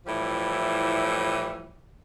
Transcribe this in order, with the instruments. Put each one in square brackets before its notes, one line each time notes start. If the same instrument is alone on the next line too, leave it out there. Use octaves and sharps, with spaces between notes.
[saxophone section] A2 E3 F3 G3 E4